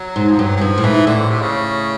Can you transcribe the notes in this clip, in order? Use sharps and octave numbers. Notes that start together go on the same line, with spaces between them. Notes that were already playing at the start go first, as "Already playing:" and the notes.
Already playing: F#3
G#2
F3
G2 F#3
F#3
G2 F3
A2
G#2 E3
A2 D3
C3
C#3